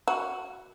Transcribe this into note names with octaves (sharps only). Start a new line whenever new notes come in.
F#4